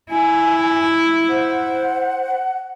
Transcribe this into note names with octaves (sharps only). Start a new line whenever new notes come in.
E4 G#5
C5 F#5